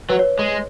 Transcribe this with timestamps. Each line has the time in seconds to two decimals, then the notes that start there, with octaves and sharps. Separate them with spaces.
0.09 F#3 B4
0.19 C#5
0.39 G#3